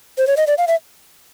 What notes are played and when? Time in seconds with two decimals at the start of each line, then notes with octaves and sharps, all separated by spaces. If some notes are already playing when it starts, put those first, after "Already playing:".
0.18 C5
0.27 C#5
0.37 D#5
0.47 D5
0.58 F5
0.68 E5